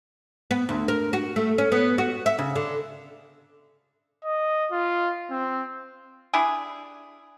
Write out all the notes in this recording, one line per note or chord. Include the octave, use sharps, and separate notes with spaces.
B3
D2
A#4
F#4
A3
C#4
B3
F#4
E5
C#3
D3
D#5
F4
C4
D4 E4 G4 G#4